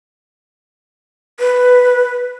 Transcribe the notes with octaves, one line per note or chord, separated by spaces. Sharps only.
B4